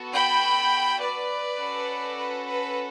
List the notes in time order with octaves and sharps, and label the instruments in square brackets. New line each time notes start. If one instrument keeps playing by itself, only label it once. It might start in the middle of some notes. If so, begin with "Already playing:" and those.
Already playing: [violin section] B3 F#4 A4
G5 B5
B4 D5
C#4 F#4 A4
B4
B4